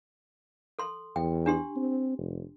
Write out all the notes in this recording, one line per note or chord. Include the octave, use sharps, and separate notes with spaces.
A4 C6
E2 G5
D4 G4 C6
C4
F1